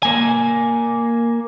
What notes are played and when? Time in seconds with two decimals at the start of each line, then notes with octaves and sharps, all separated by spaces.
0.03 A#3 G#5